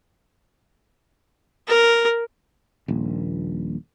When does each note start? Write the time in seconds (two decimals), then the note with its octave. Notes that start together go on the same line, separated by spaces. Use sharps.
1.68 A#4
2.88 D#1 A#1